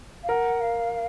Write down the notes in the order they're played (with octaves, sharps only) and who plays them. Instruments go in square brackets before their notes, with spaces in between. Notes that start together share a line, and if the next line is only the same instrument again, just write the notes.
[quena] F5
[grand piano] A#4 [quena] F#5
[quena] F5